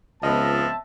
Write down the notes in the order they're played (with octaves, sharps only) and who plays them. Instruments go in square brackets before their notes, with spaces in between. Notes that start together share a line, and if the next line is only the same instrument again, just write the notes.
[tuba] C#2 [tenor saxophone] F3 [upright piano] B3 D#5 [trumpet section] C4 E5 A5